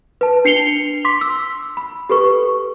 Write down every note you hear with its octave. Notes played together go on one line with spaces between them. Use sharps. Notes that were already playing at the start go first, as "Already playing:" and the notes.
B4 A5
D4 C7 C#7 F7 G7
C6 D6 B6
E6
B5
G4 A4 B4 C#6